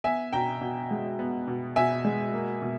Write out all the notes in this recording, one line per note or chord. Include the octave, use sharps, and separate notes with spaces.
B3 E5 G#5
B2 G5 A#5
B2
G#3
B3
B2
B2 E5 G#5
G#3
A#3
B2